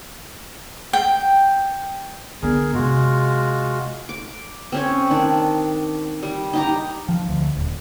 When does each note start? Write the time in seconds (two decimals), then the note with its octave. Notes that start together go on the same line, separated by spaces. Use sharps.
0.93 G5
2.42 D3 B3 G#4 A#4
2.74 C3 G#3 F4 F#4
4.09 D6
4.72 C4 C#4 C#5
5.10 D#3 D4
6.23 G3
6.53 D#4 G4 A#5
7.09 F3
7.29 D2
7.57 D#1